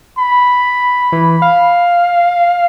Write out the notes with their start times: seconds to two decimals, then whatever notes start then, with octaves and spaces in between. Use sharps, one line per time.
0.18 B5
1.12 E3
1.42 F5